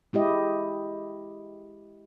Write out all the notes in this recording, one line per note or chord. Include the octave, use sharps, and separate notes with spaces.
G#3 E4 G4 D#5